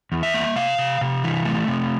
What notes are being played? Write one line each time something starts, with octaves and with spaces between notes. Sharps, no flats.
E2
E5
A#3
C3 F5
C3
C3
E3
A3
C3